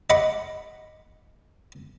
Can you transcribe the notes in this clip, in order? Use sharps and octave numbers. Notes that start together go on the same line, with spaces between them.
D#5 F#5 B5 D6